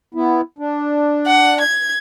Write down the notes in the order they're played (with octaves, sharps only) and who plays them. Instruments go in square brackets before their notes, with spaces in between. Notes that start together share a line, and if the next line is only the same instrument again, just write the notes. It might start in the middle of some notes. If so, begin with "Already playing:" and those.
[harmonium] B3 E4
D4
[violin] F#5
G#6